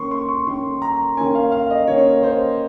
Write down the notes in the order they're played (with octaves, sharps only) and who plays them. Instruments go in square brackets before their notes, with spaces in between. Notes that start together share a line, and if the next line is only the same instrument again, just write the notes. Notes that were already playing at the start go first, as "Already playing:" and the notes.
Already playing: [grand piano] D#3 A#3 C#4 C6 C#6
C6
C#6
D#3 A#3 C#4 C6
A#5
D#3 A#3 C#4 G#5
F5
F5
D#5
D#3 A#3 C#4 C#5
C5